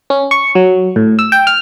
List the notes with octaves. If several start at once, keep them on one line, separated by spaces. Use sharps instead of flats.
C#4
C#6
F#3
A2
E6
G5
F6